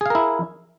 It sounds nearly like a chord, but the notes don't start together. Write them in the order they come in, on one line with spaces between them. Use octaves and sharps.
G#4 F5 A#4 E4